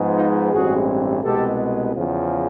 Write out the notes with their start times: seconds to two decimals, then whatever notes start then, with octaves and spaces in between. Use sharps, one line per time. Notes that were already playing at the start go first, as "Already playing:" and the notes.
Already playing: G#2 F3 G#3 B3
0.16 D#4 F4
0.52 A1 G2 E3 G#3 C4 F#4 G#4
1.23 C2 B2 G#3 B3 G4 A4
1.95 E2 C#3 F3